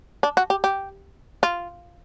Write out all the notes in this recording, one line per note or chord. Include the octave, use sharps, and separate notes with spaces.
D4
F#4
G4
G4
F4